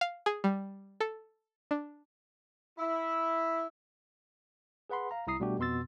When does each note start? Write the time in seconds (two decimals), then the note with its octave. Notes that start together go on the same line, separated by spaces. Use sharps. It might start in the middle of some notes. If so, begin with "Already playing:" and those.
0.01 F5
0.26 G#4
0.44 G3
1.00 A4
1.71 D4
2.78 E4
4.90 G#4 B4 F#5 B5 C6
5.11 F5 A#5
5.27 C2 E4 A#5 D#6 C7
5.40 B2 G3 A3 D4 F#4 G4
5.58 F2 B2 B3 C6 E6 A6